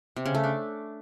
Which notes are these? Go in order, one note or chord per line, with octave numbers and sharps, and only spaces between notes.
C3
C#3
A3
D4